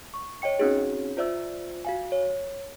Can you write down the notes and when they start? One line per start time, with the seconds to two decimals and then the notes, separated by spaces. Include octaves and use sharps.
0.14 C#6
0.42 C#5 D#5 G5 C#7
0.59 C4 C#4 D#4 F#4 G#4 C#5
1.17 F4 C5 D5 E5 E6
1.85 F#4 F5 G#5
2.12 C#5